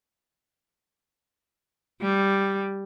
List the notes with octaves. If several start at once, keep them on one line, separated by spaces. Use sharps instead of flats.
G3